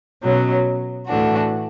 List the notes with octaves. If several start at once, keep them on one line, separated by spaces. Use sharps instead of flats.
B2 F#3 C#4
A2 E3 A3 D4 F#4